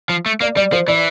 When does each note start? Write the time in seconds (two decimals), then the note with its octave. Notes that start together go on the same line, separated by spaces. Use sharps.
0.09 F3
0.26 A3
0.41 A#3 D5
0.56 G3 D5
0.72 F3 C5
0.88 E3 D5